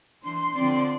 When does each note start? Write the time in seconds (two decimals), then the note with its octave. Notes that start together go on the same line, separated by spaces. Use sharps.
0.22 E3 D4 C6
0.55 D3 F3 C4 D5